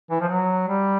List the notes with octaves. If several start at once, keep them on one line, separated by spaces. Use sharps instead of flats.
E3
F3
F#3
G3